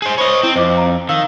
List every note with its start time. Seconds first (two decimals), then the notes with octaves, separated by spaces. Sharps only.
0.02 G#4 C5
0.18 C5 C#5 D#5 B5
0.43 C4 E4
0.56 F2 C5 D#5 D6
0.77 A#5
1.09 D#3 F5 E6